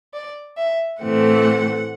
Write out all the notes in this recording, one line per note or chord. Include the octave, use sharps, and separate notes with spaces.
D5
E5
A2 E3 A3 C4 F#5